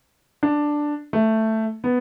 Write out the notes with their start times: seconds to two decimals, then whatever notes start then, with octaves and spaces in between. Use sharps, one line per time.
0.43 D4
1.13 A3
1.84 B3